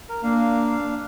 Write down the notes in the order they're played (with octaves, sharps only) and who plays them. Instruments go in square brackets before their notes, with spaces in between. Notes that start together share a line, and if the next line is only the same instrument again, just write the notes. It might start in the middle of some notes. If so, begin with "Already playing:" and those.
[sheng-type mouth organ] A#4
[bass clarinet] A#3 [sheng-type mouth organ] D4 F5